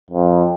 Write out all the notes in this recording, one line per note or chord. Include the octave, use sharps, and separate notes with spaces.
F2